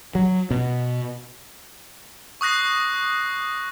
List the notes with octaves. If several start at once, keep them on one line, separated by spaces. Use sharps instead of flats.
F#3
B2
C#6 D#6 F#6 A#6 C7